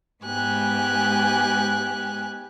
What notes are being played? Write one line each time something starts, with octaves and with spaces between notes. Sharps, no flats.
G#2 G#3 B3 G4 G#5 F#6